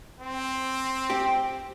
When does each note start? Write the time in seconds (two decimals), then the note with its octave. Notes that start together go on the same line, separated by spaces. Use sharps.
0.20 C4
1.10 G4